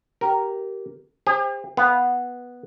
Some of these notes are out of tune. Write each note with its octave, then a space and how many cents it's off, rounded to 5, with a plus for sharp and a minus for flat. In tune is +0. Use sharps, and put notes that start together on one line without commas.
G4 -20 A#4 +0
G4 +45 C5 +0
B3 -5 F5 +0